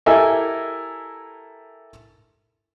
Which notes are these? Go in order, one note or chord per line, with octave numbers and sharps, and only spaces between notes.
E4 G4 A4 A#4 E5 G#5